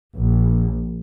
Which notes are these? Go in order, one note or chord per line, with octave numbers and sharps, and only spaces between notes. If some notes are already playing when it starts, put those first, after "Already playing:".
A#1